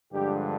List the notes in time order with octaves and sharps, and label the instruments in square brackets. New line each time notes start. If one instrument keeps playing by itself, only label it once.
[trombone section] G2 D3 F3 G#3 G4